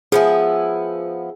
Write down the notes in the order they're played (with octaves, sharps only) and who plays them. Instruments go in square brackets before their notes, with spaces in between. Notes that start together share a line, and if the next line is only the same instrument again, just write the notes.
[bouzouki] F3 B3 E4 [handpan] G#4